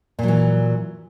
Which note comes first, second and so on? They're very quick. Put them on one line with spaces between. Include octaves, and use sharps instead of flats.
A#2 F#3 E3